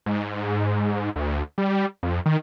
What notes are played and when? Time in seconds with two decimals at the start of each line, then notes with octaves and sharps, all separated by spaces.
0.06 G#2
1.16 D2
1.58 G3
2.03 F2
2.26 D#3